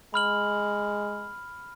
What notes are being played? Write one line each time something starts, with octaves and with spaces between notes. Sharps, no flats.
G#3 B5 F6 F#7